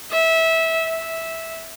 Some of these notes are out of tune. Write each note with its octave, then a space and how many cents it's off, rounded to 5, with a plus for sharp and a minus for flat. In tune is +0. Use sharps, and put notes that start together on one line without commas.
E5 -20
E5 -10